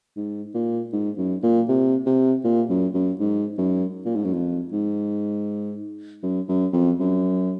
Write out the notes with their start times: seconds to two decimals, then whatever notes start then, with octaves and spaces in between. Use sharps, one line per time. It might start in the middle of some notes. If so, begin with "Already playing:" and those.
0.16 G#2
0.54 A#2
0.93 G#2
1.18 F#2
1.43 A#2
1.69 C3
2.06 C3
2.44 A#2
2.69 F#2
2.94 F#2
3.20 G#2
3.58 F#2
4.06 A#2
4.15 G#2
4.25 F#2
4.34 F2
4.72 G#2
6.23 F#2
6.49 F#2
6.73 F2
7.00 F#2